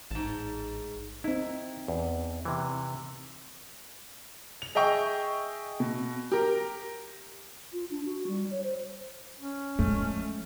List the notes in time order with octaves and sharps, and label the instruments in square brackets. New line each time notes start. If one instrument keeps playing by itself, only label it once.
[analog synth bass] A1 [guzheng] G#2 A5
[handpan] C4 D#4 [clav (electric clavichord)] E4
[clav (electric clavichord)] E2
C3 E3
[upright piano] F7
G#4 D#5 E5 G5 C#6
B2
G4 A#4
[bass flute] F4
D4
F#4
G3
C#5
C5
[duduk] C#4
[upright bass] F3 G#3 [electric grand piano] A3